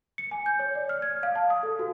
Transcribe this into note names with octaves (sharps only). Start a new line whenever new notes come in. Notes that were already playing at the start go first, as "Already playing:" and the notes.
C#7
G#5
G6
C#5
D5
F6
G#6
F5
A5
D#6
A4
F#4